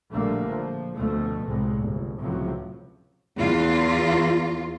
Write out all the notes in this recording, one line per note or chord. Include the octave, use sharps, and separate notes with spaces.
A#1 A2 D3 G3 A3 A#3
F3
D2 B2 F3 A3
C2 A2 C3 G#3
G1
C#2 A2 C3 F3 F#3
E2 F4